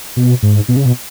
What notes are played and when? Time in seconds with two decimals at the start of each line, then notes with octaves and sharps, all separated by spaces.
0.16 B2
0.43 G#2
0.68 B2
0.77 C#3
0.85 B2